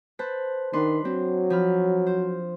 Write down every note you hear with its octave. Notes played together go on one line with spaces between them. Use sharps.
B4 C5 A5
D#3 D4 B4 C6
F#3 C4
F3 B5 F6
C5